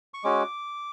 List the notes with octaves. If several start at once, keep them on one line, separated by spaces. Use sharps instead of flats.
C#6
G#3 C#4 F#4 D6